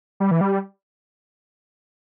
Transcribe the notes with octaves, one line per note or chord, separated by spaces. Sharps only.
G3
E3
G3